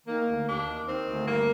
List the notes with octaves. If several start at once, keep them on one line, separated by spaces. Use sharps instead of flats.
D#3 A#3
D2
D#2 D4
D#3
D#3 C4
D2
G2 A#3